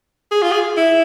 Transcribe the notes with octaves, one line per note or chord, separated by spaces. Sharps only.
G#4
F4
G#4
E4